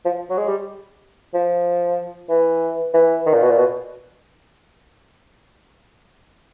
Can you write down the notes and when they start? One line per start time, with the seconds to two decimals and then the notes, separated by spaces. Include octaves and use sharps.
0.05 F3
0.30 F#3
0.37 G#3
0.48 G3
1.34 F3
2.29 E3
2.94 E3
3.26 D#3
3.34 A#2
3.42 B2
3.50 A#2
3.58 B2